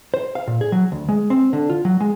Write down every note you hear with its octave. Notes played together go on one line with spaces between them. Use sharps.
C5
F5
A#2
G#4
F#3
D2
G#3
C4
D3
F4
F#3
G#3